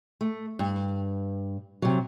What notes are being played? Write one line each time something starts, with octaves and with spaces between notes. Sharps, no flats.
A3
G2
C3 F#3